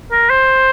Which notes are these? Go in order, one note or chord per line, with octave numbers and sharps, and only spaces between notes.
A#4
C5